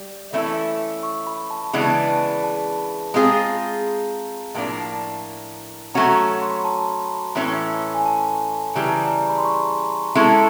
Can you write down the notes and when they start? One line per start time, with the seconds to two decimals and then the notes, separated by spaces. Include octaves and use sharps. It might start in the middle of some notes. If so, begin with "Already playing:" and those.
Already playing: G3
0.33 E3 A3 C#4 E4
1.03 C#6
1.27 B5
1.50 A5
1.73 C#3 E3 G#3 B3 D4
2.44 A5
3.14 G#3 C4 F4 G#4 A#5
4.54 A2 F3 A#3 D4
5.95 F#3 A3 C#4 F#4 A#5
6.42 C6
6.50 B5
6.57 A#5
6.65 A5
7.35 A2 E3 A3 C#4
7.94 G#5
8.06 A5
8.75 C#3 E3 G3 A#5
8.89 A5
9.03 A#5
9.21 A#5
9.29 B5
9.38 C6
9.45 C#6
10.15 G#3 C#4 E4 A4